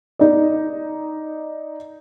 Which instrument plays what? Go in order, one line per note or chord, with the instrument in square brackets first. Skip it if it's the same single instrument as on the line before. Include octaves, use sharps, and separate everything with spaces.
[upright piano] D#4 D5